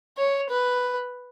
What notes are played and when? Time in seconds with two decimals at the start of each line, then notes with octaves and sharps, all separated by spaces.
0.18 C#5
0.50 B4